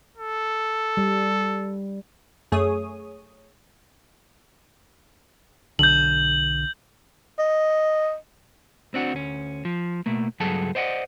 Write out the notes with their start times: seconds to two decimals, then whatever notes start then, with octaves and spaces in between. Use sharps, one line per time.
0.17 A4
0.97 G3
2.52 F#2 A3 G#4 C#5 D#6
5.79 B1 D3 G6 F#7
7.39 D#5
8.94 C4 D4 F#4
9.13 D2 C#4
9.65 F3
10.06 B2 A3 A#3
10.40 C#2 G2 F#3 G#4 A4 A5
10.75 C5 D5 D#5 F#5